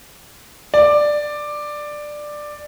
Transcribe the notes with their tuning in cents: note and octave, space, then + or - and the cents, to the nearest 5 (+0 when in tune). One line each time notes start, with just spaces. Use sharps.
D5 +10